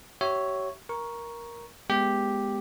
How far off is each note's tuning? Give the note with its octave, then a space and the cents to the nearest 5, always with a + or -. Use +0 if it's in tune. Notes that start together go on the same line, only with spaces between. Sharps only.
G4 -45 C#5 +0 E5 +0
A#4 +10 C#6 +0
G#3 +5 B3 +0 G4 +0